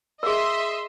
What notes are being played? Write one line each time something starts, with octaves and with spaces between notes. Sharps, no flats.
G#4 A#4 D#5 E5 C6